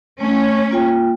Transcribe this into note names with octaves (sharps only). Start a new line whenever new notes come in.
A3 C#4
A#3 F4 G5